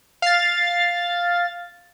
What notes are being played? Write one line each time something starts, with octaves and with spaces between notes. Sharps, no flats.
F5 A6